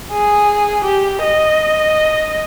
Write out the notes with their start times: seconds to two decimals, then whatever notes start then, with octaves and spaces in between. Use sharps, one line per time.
0.12 G#4
0.84 G4
1.23 D#5